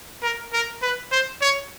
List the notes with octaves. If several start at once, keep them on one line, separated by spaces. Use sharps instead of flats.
A#4
A#4
B4
C5
C#5